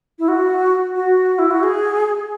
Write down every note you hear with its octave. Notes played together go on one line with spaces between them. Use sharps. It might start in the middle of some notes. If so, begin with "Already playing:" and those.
E4
F#4
F#4
E4
F#4
G#4